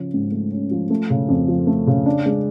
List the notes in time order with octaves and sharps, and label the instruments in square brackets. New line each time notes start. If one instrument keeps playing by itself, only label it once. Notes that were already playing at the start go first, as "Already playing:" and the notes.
Already playing: [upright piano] C#3 F3 C#4
G#2
A3
C#4
F3
A3
C#3
F2
F3
A3
C#3
D4
G#3